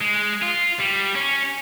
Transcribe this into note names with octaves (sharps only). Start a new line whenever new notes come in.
G#3
F4
G3
C#4